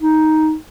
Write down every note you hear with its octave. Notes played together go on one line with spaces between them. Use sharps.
D#4